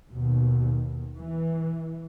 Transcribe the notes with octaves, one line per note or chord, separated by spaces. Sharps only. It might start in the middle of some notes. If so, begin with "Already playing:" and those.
D#2 B2
E3